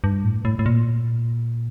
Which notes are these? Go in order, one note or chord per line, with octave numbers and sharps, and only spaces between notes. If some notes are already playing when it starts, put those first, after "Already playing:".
G2
A2
A2
A2
A#2